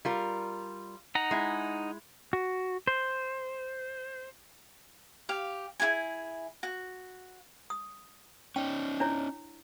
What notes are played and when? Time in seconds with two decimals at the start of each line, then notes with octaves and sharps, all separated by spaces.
0.05 G3 F4 A#4
1.15 D#4 F#5 A#5
1.31 G#3 E4
2.33 F#4
2.87 C5
5.29 G4 F5
5.80 E4 F4 G#4 G#5
6.63 F#4
7.70 D#6
8.56 C#4 D#4 G5
9.00 D4 E4 C#5